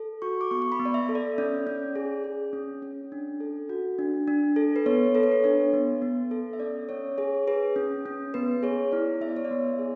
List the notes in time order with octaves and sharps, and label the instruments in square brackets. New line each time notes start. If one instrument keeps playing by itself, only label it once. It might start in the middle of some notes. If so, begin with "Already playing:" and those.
Already playing: [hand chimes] A4
F#4 C#6
D6
B3 C#6
C#6
B5
B3
D5
E5
A4
D5
C#4 D5
C#4
G#4
G#4
C#4
C#4
D4
A4
F#4
D4
D4
A4
B4
B3 C#5
A4 B4
C#5
B4
D4 C#5
B3
B3
A4
E5
C#4 D5
C#4 C#5
G#4 C#5
G#4 B4
C#4
C#4
B3 B4
G#4 C#5
E4 D5
B3 E5
D5
C#5
D5
B3
G#4